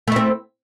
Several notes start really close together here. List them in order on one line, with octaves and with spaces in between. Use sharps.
A3 E4 C4